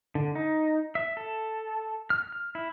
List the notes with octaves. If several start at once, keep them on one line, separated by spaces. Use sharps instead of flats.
D3
D#4
E5
A4
F6
F6
E4